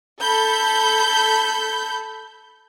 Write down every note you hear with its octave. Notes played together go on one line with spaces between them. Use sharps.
A4 B5 G6